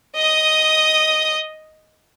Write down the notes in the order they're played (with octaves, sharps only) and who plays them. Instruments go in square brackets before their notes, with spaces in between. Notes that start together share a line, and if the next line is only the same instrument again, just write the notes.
[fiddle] D#5 D#6